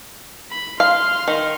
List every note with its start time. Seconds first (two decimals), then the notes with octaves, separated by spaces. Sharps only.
0.51 B5
0.80 F5 C6 F6
1.28 D#3